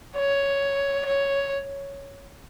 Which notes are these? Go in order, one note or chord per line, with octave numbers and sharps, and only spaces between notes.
C#5
C#5